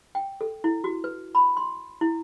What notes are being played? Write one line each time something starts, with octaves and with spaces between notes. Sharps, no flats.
G5
A4
E4
F#4
B4
B5
C6
E4